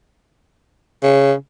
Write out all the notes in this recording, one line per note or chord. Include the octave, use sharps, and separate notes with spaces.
C#3